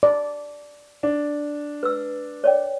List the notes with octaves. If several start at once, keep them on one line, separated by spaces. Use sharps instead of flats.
D5
D4
B4 E6
C#5 D5 G5